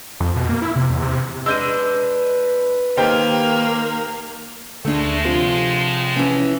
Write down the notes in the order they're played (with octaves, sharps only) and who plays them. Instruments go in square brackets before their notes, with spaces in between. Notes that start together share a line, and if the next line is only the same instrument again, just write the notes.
[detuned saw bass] F2
B2
A#3
E4
C3
E2
C3
[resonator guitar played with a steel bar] G#3 D4 [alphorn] B4 [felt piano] E6 G6 D#7
[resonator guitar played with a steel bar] D#3 [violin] A#3 [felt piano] G4 C5 G5
[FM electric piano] D2 [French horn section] A2 G#3 [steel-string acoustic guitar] A3 D4
[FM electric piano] C3 F3 [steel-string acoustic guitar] F4
[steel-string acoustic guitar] E3 C#4